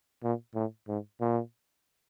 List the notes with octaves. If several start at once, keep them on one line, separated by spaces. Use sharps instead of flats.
A#2
A2
G#2
A#2